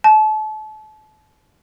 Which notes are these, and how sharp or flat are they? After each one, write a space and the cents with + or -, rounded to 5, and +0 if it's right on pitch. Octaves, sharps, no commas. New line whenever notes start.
A5 -35